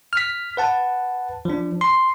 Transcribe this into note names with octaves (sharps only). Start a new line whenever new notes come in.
F6 B6
B4 F#5 A5
F3 D4
C6